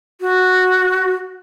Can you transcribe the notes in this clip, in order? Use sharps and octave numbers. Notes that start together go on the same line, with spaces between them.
F#4